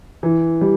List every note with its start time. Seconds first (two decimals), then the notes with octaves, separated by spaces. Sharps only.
0.23 E3
0.61 G3